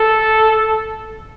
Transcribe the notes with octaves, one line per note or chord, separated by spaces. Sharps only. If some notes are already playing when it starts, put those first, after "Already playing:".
Already playing: A4